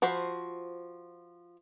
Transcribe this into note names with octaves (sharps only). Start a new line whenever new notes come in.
F3 F#4 C5 B5